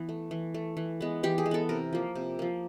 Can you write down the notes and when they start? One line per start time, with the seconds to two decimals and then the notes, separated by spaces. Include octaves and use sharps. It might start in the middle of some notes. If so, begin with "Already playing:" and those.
Already playing: E3 B3
0.09 A3
0.31 E3
0.54 A3
0.77 E3
1.01 G#3 B3
1.23 E3 G4
1.38 G#4
1.46 G#3
1.51 B3 A4
1.69 C3 A#4
1.93 F3 A#3
2.15 C3
2.39 F3 A#3